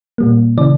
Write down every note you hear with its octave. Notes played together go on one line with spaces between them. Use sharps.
A#2 G3 A#3
C#3 E3 D5